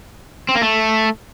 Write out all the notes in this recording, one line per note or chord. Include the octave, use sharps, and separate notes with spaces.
C4
A#3
A3